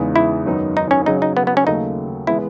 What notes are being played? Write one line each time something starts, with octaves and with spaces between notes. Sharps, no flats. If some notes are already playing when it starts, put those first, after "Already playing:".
Already playing: E2 C#3 G#3 B3 D#4
E4
F#2 D#3 F#3 B3 D#4
D#4
C#4
C#3 F#3 C#4 D#4 G#4
D#4
B3
B3
C#4
D#2 C#3 F#3 A3 D#4
E3 G#3 B3 E4